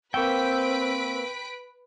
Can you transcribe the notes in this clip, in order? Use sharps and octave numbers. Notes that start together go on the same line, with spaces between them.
A#3 C4 B4 G5 C#6 E6 B6 D7